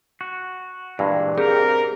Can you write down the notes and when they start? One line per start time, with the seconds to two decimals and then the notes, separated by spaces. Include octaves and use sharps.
0.21 F#4
0.99 G2 A#2 E3 G#3
1.38 C4 G4 G#4 A#4 F5